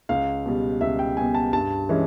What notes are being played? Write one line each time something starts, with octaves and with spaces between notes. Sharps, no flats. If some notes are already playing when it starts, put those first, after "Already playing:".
C#2 F5
B2 G3
C#2 E5
G5
B2 G3 G#5
A5
G2 A5
E3 G#3 C#4